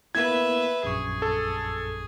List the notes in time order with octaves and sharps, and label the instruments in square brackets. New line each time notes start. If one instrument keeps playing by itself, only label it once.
[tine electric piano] A#3 B3 E4 [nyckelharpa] B4 E5 [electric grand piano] G#6
[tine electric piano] A#1 F#2 C#6 [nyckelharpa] G#4
[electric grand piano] A4